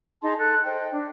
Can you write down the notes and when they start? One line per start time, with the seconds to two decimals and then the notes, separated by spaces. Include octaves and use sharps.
0.22 D#4 G#4 A5 C6
0.38 A4 F#6
0.64 C5 D#5 G5
0.90 D4